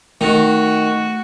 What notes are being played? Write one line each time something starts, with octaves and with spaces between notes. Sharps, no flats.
D#3 A3 F#4